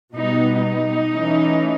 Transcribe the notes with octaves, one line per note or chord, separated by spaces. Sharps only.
B2 G3 B3 D#4
D#4
E3 A3 C#4